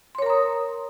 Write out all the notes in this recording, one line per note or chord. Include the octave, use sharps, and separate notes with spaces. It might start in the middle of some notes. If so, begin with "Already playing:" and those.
A#4 C#5 A#5 C6 D#6